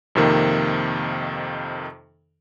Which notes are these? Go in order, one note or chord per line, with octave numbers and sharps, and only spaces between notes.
F2 C3 D#3 A#3